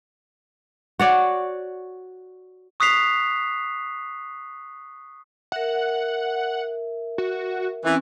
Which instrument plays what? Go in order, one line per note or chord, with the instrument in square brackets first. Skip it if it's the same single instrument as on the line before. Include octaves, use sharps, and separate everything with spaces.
[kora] F#4 C#5 D5
[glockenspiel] C#6 D#6 F#6 B6 C7 F7
[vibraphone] A#4 E5 [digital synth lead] F#5
[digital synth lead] F#4
[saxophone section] E3 [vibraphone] C4 C#4